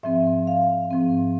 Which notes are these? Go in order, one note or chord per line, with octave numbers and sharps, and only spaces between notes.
G#2 F3 C4 E5
F5
G#2 F3 C4